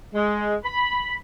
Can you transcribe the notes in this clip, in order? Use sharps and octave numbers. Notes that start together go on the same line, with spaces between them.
G#3
B5